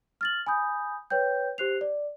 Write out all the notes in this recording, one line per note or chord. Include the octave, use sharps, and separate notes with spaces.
F6 A6 F#7
G#5 B5 D#6 G6
B4 C#5 G5 G6
G4 C5 F#6 C7 F7
D5